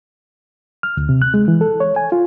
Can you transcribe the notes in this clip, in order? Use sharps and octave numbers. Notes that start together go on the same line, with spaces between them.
F6
D2
C3
F#6
G#3
E3
A4
C#5
G#5
F4